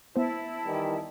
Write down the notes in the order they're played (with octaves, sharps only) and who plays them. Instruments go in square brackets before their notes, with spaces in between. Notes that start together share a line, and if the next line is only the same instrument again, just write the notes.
[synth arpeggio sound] B3 C5 [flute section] E4 A5
[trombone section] D#3 E3 G3